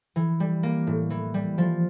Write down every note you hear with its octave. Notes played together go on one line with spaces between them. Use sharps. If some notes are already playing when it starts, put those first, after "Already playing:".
E3
G3
A#3
A2
E3
G3
F3